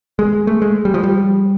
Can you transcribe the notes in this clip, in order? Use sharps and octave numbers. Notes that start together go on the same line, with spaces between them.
G#3
A3
G#3
G3
F3
G3